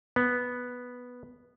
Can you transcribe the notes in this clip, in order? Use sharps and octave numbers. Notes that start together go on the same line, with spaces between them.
B3